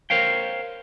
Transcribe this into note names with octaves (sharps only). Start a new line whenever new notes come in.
A#4 C5 C#5 F5 G5